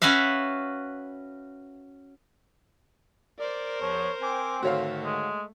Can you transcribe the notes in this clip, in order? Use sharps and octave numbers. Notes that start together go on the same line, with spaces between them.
C#4 F#4 B4 E5 F5
A#4 C5 D5
E2 F3 C#5
C4 G5 G#5 D6
G#2 D3 D#3 A3 F#4 C#5 F5
G#3